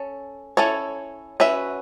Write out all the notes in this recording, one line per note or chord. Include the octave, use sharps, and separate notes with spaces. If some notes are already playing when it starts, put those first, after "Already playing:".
Already playing: C#4 A4
C#4 E4 A4 C#5
C#4 F#4 B4 E5